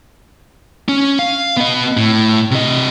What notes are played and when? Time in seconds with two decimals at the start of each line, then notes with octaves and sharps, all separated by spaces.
0.89 C#4
1.19 F5
1.57 B3 D#5
1.97 A2
2.51 C3 D#5